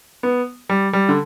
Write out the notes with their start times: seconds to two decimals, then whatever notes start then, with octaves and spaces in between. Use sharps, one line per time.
0.23 B3
0.70 G3
0.93 G3
1.09 D3